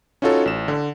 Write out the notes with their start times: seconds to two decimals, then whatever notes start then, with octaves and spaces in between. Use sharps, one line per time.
0.22 C#4 D#4 F4 F#4 A4 C#5
0.45 A1 E7
0.68 D3